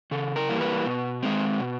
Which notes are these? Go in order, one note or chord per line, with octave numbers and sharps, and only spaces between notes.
C#3 A4
A#4
E3 G3 A#3
B4
B2
G#3 C4
B2